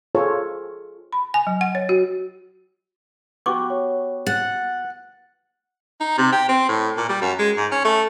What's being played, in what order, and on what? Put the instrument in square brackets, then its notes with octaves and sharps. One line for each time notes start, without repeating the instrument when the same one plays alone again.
[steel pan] F4 G#4 A4 C5 C#5
[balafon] B5
G#5
F#3
F#5
C#5
F#4
[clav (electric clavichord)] B3 F#4 G4 [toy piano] C#6 D6
[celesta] C#5
[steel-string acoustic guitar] F#5 [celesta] A6
[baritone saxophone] D#4
C3
G4
C4
A2
A#2
G3
F#2
G#3
G#2
C#4
A3